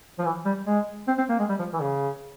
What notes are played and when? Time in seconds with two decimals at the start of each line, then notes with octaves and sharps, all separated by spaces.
0.19 F3
0.25 E3
0.45 G3
0.66 G#3
1.08 C4
1.18 C4
1.29 A#3
1.39 G#3
1.49 G3
1.59 F3
1.73 E3
1.81 C#3